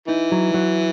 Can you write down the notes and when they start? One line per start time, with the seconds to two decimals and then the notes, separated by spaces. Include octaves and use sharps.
0.08 E3 D#4
0.32 F#3
0.54 F#3